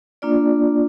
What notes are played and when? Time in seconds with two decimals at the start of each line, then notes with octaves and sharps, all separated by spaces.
0.22 A#3 D4 F4 D5